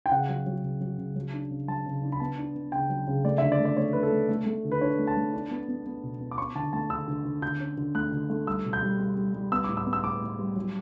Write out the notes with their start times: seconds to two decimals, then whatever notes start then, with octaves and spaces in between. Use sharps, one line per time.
0.06 G5
0.11 C#3 F#5
0.29 F#3
0.46 F#3
0.64 C#3
0.81 F#3
0.98 C#3
1.16 F#3
1.33 D4
1.51 C#3
1.68 F#3 A5
1.86 C#3
2.03 D4
2.12 B5
2.20 B3 A5
2.38 D4
2.55 B3
2.72 C#3 G5
2.90 F#3
3.07 C#3
3.25 A3 D5
3.38 D3 E5
3.52 D5
3.59 A3
3.65 D5
3.77 A3 C#5
3.93 A3 B4
4.03 A4
4.12 A3
4.29 A3
4.46 A3
4.65 D3
4.72 B4
4.81 D4 C#5
4.99 A3
5.07 A5
5.17 A3
5.34 D4
5.51 B3
5.68 B3
5.86 B3
6.03 B2
6.21 B3
6.31 D6
6.38 C#4 C#6
6.55 D3 A5
6.73 A3 A5
6.90 D3 E6
7.08 D3
7.25 D3
7.42 D3 G6
7.60 C#4
7.77 D3
7.95 A3 F#6
8.12 D3
8.30 A3
8.47 G3 E6
8.65 B2
8.73 G6
8.82 G3
8.99 G3
9.17 G3
9.34 G3
9.52 B3 E6
9.64 A2 D6
9.77 E6
9.86 B3
9.93 E6
10.03 A2 D6
10.21 A2
10.39 G3
10.56 F#3